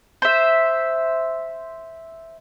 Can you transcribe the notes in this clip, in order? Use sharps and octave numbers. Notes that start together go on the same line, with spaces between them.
C5 E5